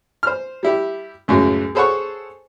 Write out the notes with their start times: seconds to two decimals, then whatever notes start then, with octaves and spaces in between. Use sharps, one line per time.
0.23 C5 F6
0.63 G3 E4 G4
1.28 C#2 F#2 A2 F#3 G#3
1.75 G#4 A4 C5 C#5 F#5 C#6